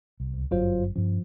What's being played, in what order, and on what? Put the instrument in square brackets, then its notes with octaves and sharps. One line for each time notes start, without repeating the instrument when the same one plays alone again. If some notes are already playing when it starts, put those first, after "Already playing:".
[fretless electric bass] C2
[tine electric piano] C#2
[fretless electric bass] G1 F#2 [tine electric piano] F#3 F4 C5
[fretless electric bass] G2 C#4 [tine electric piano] F3